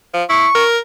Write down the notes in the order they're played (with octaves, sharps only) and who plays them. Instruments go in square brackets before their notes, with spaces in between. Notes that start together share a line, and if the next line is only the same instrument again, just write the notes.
[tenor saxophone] F3
[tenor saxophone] E4 [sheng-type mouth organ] C#6
[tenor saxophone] A#4